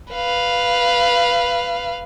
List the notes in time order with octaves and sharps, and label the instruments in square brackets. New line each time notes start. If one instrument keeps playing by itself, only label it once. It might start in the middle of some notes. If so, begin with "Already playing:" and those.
[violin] B4 F5